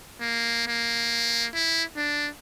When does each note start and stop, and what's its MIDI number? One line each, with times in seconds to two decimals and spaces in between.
0.21 0.63 58
0.68 1.47 58
1.55 1.83 64
1.97 2.29 62